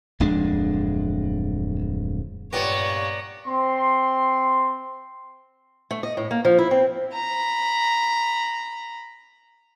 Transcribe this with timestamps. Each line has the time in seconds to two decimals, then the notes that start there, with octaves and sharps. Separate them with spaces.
0.20 D1 F2 G#3 D4
2.53 G2 A#2 B3 C#5 D5 G5 A#5
3.47 C4 C6
5.91 A3
6.03 D#5
6.17 A2
6.31 A#3
6.45 F3
6.59 E4
6.71 C4
7.13 A#5 B5